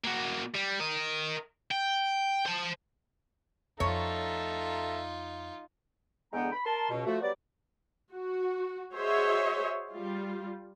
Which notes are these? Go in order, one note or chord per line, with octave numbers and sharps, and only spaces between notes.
A#3 F#4
G3
A#4 D#5
G5
C5 A5
F2 D#4 F4 A4 C#5 E5 A#5
E2 D3 G#3 B3 G5 A#5
B5
A#4 A5 C6
C#2 B2
F3 A3 F#4
F#3 G3 B3 D5
F#4
F#4 G#4 C5 C#5 D#5 E5
G3 F4